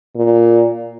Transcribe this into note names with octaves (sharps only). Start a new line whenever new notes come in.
A#2